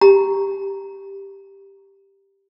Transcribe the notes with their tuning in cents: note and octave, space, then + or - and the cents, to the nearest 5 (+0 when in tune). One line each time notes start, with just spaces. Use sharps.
G4 +0 A#5 +0